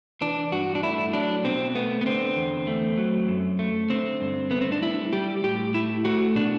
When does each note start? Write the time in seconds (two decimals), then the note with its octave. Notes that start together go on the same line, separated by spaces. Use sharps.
0.21 E3 D4
0.51 G2 F#4
0.75 D4
0.83 A3 E4
1.13 F#3 D4
1.44 B2 C4
1.75 A3 B3
2.01 B3
2.06 D3 C4
2.36 E2
2.67 A3
2.98 F#3
3.28 F#2
3.59 A3
3.90 D3 C4
4.21 G2
4.51 A3 B3
4.61 C4
4.72 D4
4.82 G3 E4
5.13 G3 G4
5.44 A2 G4
5.74 A3 E4
6.05 A3 F#4
6.35 B2 D4